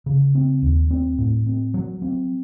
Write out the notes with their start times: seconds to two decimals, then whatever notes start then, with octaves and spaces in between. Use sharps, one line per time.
0.06 C#3
0.35 C4
0.62 D#2
0.91 C4
1.18 A2
1.46 C4
1.74 F#3
2.02 C4